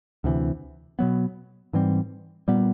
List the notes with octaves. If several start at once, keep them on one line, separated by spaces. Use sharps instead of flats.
D2 C3 E3
B2 F#3 B3
G#2 E3 G3 C4
A#2 G3 B3